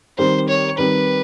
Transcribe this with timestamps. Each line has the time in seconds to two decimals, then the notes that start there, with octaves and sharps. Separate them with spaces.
0.18 D#3 G3 C4 C5
0.49 C#5
0.78 D#3 G3 C4 B4